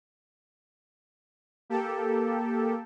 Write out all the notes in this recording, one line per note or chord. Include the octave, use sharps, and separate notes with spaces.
A#3 G4 A4